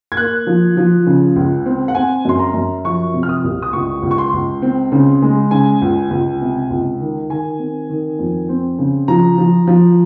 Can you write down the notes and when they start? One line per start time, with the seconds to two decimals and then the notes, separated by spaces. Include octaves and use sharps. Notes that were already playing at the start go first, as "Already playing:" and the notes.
0.12 G#6
0.17 A#3 F#6
0.47 F3
0.77 F3
1.07 C#3
1.36 C#2
1.66 C4
1.88 F#5
1.95 C4 G#5
2.25 F#2 C6
2.39 A#5
2.54 F#2
2.85 F3 C#6
3.14 C3
3.23 F6
3.29 D#6
3.44 C2
3.62 D#6
3.73 C#2 C#6
4.03 C#2
4.11 C#6
4.18 C6
4.33 C#2
4.62 C4
4.92 C#3
5.22 G#3
5.51 C#3 G#5
5.82 C#2
6.10 C#2
6.41 C3
6.70 C#2
7.00 D#3
7.30 D#3 G#5
7.59 C4
7.90 D#3
8.19 F2
8.49 C4
8.79 C#3
9.08 F3 A#5
9.38 F3
9.67 F3